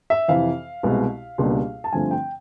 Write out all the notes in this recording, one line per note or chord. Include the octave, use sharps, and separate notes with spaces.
E5
F2 C3 E3 F5
C2 B2 G#3
C#2 B2 G3 A#3 D4
A5
G2 D3 F3 A3 C4 G#5
G5